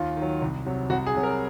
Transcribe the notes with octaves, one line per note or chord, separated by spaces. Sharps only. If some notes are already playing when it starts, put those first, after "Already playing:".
Already playing: D#2 F4
D#3
F#3
C2
C3 F#3
C2 F#4
G#4
C3 F#3
A#4